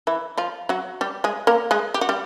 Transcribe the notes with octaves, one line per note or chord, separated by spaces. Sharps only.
E3 E4
F3 F4
F#3 F#4
G3 G4
G#3 G#4
A#3 A#4
G#3 G#4
G4
F#4
G3 G4